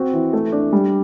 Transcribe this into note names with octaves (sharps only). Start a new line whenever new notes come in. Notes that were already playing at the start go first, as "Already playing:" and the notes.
Already playing: C4 F#4
E3
A3
D4
G3